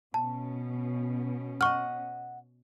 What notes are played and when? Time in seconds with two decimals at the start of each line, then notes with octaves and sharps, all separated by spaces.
0.14 B2 C#4 A5
1.61 D#5 F#5 C#6 F6